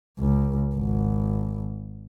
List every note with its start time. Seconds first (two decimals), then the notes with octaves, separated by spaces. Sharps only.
0.19 C#2
0.75 G#1